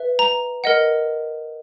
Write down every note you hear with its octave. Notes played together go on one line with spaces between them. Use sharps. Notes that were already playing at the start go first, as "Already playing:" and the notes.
Already playing: B4 E5
A#5
A#4 D#5 F#5